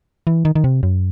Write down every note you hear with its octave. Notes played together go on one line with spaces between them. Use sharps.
E3
D#3
D#3
C3
F#2